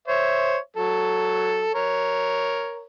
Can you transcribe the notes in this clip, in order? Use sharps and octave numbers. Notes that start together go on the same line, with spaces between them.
C5 C#5 E5
F#3 A4
A#4 C#5